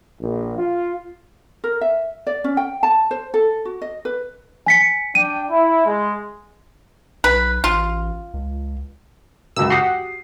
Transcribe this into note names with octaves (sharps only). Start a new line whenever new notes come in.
A#1
F4
A#4
E5
D5
C#4
G5
A5
C5
A4
F#4
D#5
B4
G#5 B6 C#7
D4 G5 D#7
E4
G#3
B1 B4
A1 F4
C#2
C#2 F#2 E6
F#4 G4 F#5 D#6 C7